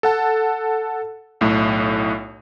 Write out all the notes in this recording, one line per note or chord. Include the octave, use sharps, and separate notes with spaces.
A4 F#5 A5
B1 A2 A3